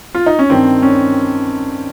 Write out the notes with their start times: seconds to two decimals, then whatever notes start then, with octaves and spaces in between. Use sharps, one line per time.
0.15 F4
0.26 D#4
0.39 C#4
0.50 G2 D#3 C4
0.82 C#4